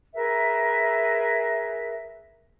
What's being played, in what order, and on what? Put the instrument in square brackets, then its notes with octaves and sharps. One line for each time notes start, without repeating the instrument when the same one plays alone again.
[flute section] G#4 A#4 B4 E5